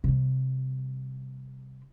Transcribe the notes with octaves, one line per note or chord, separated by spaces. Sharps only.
C3 G3